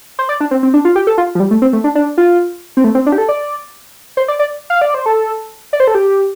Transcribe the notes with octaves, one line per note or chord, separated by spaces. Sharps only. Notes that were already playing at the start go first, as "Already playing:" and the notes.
C5
D5
D4
C4
C4
D4
F4
G4
A4
F4
F3
G3
A3
C4
A3
D4
D4
F4
C4
A3
C4
D4
G4
A4
D5
C5
D5
D5
F5
D5
C5
A4
D5
C5
A4
G4